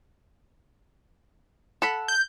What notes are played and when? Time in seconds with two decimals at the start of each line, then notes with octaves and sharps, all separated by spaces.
1.82 A4 F#5 B5
2.08 G6